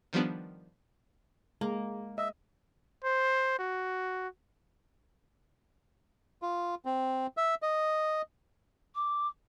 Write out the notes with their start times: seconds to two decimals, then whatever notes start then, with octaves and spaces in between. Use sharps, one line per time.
0.13 D#3 F3 G3 B3 D4
1.61 G#3 A#3
2.18 D#5 E5
3.04 C5
3.59 F#4
6.42 F4
6.85 C4
7.37 E5
7.62 D#5
8.95 D6